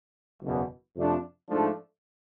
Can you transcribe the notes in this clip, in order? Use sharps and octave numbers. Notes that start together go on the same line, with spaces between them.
F#1 E2 B2
F2 C3 F3 A3 D4
G#2 F3 A3 D4